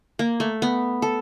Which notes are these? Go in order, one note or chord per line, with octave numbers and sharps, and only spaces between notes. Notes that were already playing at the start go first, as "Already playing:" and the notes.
A#3
A3
B3
A4